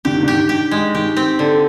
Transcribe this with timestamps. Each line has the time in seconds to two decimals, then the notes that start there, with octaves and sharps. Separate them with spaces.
0.05 D3 G4
0.14 D#3
0.23 D3 G4
0.49 G4
0.71 G#3
0.95 D#3 G4
1.17 C4
1.39 D3